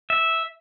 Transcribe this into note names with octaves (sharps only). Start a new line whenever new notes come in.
E5